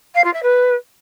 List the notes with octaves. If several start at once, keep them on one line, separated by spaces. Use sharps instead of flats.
F5
F4
E5
B4